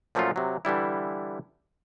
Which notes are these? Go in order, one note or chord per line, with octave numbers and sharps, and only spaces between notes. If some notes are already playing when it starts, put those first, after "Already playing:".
A#2 F3 F#3 A3 C#4 F4
C3 F#3
D3 E3 G3 E4